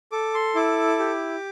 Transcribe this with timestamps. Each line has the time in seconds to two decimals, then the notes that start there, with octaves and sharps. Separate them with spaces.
0.12 A4 D6
0.34 C6
0.55 E4 D6
0.99 G4